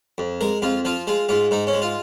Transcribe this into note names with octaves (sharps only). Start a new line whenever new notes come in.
F2
G#3 A#4
F2 F4
F3 F4
G#3 F4
G#2 F4
G#2 D#4
C#4
G#3
F4